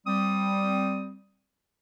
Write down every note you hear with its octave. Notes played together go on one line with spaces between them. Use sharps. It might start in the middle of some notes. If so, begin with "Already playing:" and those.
G3 C4 D#6